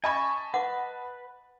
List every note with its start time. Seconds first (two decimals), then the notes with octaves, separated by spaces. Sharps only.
0.04 D#5 G#5 A5 B5 C#6
0.54 B4 F#5 D6